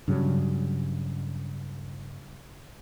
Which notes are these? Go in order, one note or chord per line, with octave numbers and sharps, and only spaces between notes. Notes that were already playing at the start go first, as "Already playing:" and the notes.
G2 C#3 F#3